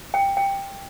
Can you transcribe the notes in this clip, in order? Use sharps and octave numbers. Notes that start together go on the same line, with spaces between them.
G5
G5